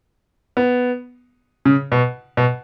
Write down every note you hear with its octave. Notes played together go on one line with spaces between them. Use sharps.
B3
C#3
B2
B2